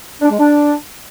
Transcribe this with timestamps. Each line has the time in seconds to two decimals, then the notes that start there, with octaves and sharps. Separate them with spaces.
0.21 D4
0.30 G#3
0.39 D4